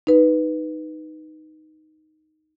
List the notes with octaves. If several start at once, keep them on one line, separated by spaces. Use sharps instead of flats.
D#4 B4